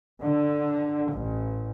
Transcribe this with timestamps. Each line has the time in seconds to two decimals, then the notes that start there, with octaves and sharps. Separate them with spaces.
0.21 D3
1.10 A1